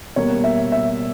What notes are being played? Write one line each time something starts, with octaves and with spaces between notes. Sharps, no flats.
B2 G3 A#3 C#5
E5
E5